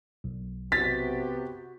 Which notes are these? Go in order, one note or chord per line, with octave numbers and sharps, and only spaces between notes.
B1
C3 B3 F#4 G4 A6 B6